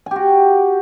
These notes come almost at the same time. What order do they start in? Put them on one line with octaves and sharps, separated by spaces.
G#5 G4 F#4